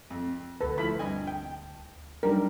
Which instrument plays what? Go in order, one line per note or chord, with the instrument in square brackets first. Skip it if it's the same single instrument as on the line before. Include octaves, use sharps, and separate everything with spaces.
[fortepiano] F2
[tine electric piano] D2 A5 [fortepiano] A4 [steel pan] B4
[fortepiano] F3 A3 E4 [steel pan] B5
[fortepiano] G2 D#5 G#5
G5
[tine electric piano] F#3 D4 D#4 [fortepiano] G3 [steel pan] A#4